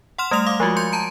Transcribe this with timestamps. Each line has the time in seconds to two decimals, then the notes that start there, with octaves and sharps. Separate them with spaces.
0.18 F#5 C6 F6 E7
0.31 G3 A3 D#6 F7
0.46 F5 D6 D#6
0.60 F3 G#3 F4 F#4
0.77 C6 G6 C#7
0.93 A5 A#5 D7